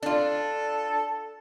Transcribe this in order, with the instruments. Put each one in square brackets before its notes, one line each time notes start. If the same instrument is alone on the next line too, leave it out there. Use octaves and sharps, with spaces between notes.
[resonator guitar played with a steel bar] D4 F4 [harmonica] A4